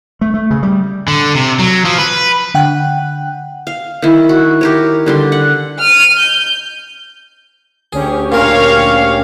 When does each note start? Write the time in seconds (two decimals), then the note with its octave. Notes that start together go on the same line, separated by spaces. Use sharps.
0.21 A3
0.34 A3
0.51 C#3
0.63 G3
1.08 D3
1.35 C3
1.59 F#3
1.85 F3
1.98 B4
2.54 D3 F#5 G5 F#6
3.67 F5
4.02 D#3 E4
4.29 F#4
4.61 G4 A#4 C#5
5.06 D3 G3 C6
5.32 F#5
5.79 F6 D#7
6.19 G6
7.93 D2 C#4 G4 G#4
8.32 A#2 A#4 C#5 F5